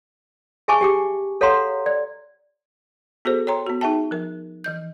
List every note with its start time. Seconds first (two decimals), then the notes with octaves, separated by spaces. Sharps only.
0.68 G#4 E5 G#5 A5 C#6 D6
0.81 G4 G5 D6
1.41 A4 C#5 F5 F#5 A#5 C6
1.86 D5
3.25 B3 F#4 G#4 A4 C5
3.47 C#5 G5 A#5 C6
3.66 B3 F#4
3.81 D#4 G#4 E5 G5 A5
4.11 F3 A#4
4.64 E3 D#5 G6